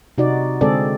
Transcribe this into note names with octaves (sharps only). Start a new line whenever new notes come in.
C3 D#4 F#4 D5
D3 G#3 C4 G#4 A4 D5